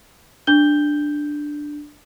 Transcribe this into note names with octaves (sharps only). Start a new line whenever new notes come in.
D4 G6 G7